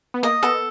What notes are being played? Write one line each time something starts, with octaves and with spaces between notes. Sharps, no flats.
B3
A#3 D#5
B3 A4